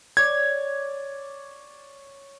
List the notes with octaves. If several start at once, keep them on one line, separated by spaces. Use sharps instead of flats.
C#5 D5 G#6